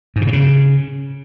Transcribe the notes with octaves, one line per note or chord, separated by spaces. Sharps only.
G#2
C#3
A2
C#3